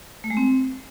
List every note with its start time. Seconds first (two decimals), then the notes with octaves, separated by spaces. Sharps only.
0.24 A3
0.30 G#3
0.37 C4